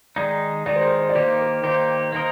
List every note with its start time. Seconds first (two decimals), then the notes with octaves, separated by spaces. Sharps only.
0.16 D#3 G#3 D#4 D5
0.66 D#3 G#3 D#4 D5
0.76 C5
0.86 A#4
0.96 C5
1.09 D5
1.15 D#3 A#3 D#4 G4 C5
1.40 A#4
1.63 D#3 A#3 D#4 G4 C5
2.12 A#3 D#4 A#4 C5 D#5